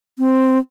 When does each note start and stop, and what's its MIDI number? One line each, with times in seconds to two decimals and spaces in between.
0.19 0.58 60